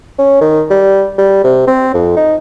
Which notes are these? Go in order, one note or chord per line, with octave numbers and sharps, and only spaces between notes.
C#4
D#3
G3
G3
C3
C4
F2
D#4